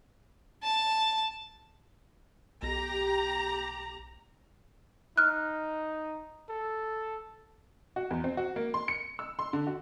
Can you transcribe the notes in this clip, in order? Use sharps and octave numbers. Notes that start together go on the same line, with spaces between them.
A5
B1 G4 A#5
D#4 F6 F#6
A4
F#4
E2
C4
F#4
A#3
C6
C#7
E6
C6
D3
F#4